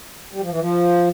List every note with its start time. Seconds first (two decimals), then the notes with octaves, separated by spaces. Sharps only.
0.32 G3
0.41 F3
0.51 E3
0.59 F3